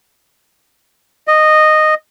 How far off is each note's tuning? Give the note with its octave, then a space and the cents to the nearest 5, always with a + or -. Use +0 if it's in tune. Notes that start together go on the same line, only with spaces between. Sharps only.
D#5 -10